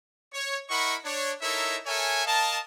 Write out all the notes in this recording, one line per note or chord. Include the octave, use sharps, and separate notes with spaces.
C#5
E4 A#4 D#5 F#5 B5 C#6
D4 C#5
D#4 E4 A4 A#4 C#5 E5
A4 A#4 C#5 E5 G#5
A#4 D#5 F5 A5